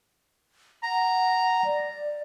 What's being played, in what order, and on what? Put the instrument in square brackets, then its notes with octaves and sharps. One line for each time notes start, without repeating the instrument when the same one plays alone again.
[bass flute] F#5 [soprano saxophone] A#5
[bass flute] D5